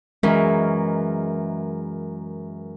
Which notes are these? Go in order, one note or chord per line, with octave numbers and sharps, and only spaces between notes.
F#2 E3 G#3 C#4 A#4